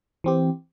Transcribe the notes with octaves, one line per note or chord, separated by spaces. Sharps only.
E3 C4 G4